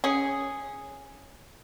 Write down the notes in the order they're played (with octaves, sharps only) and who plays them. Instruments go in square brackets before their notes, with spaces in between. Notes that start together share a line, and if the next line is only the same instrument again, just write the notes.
[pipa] C#4 G#4